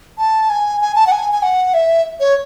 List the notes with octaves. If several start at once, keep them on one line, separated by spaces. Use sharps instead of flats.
A5
G#5
G#5
A5
F#5
G#5
G#5
F#5
E5
C#5